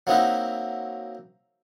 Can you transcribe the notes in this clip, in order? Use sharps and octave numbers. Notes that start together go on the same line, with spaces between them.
F#3 A#3 C4 D#4 E4 F#4